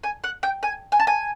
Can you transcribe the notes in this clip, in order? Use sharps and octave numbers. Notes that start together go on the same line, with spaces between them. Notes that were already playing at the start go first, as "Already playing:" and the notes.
G#5
F#5
G5
G#5
G#5
A5
G#5